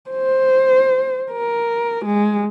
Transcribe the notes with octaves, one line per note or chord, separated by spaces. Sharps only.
C5
A#4
G#3